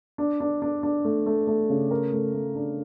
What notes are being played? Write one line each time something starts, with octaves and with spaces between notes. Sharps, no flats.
D4
D4
D4
D4
A3
A3
A3
C#3
A#4
A3
A3
D4